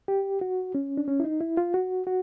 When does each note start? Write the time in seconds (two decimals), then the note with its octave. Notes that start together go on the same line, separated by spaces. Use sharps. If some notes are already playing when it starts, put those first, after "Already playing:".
0.08 G4
0.41 F#4
0.75 C#4
0.97 D4
1.08 C#4
1.20 E4
1.24 D#4
1.41 E4
1.57 F4
1.74 F#4
2.07 F#4